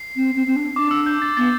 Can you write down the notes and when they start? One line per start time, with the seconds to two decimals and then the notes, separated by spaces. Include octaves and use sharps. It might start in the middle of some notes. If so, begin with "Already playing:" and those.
Already playing: C7
0.16 C4
0.36 C4
0.46 C4
0.56 D4
0.76 D4 D6
0.91 E6
1.06 G6
1.22 A6
1.37 B3 A6